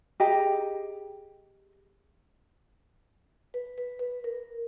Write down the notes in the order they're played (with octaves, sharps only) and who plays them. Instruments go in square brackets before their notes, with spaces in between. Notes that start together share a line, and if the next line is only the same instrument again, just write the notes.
[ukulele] G4 G#4 D#5 A#5
[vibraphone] B4
B4
B4
A#4